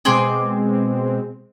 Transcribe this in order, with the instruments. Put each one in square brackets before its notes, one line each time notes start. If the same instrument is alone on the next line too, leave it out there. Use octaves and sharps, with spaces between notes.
[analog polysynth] B2 G#3 C4 [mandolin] G#4 C6 D6